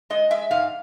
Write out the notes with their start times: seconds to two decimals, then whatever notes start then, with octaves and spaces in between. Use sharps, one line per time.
0.10 G#3 D#5
0.30 G#3 E5
0.51 G#2 F5